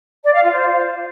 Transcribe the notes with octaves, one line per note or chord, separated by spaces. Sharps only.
D5
F5
F4
C5